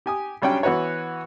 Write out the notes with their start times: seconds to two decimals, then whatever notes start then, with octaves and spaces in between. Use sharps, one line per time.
0.06 G4 G#5 D#6
0.42 B1 G3 C#4 D4 G5
0.63 E3 B3 F#4 B4 C#5